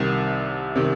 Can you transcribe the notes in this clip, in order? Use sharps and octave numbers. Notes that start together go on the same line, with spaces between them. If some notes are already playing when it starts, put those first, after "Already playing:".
Already playing: C2 C3 D#3
C3 D#3